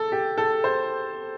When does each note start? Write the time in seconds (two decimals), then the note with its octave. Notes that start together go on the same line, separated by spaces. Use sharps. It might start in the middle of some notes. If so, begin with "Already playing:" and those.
Already playing: A4
0.12 G4
0.38 A4
0.64 C5